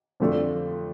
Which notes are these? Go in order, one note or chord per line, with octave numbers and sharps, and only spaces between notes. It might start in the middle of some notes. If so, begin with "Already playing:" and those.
F2 D3 F3 A3 D4